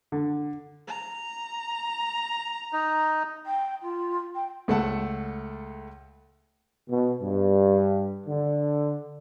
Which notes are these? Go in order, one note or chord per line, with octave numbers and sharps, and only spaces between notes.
D3
A#5
D#4
G5
F4
G5
C#2 A3 A4 F#5 A5
B2
G2
D3